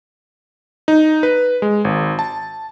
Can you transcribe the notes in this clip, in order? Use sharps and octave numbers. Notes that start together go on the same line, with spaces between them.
D#4
B4
G#3
G#1
A5